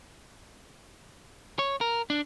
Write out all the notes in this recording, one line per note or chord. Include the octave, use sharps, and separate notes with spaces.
C#5
A#4
D4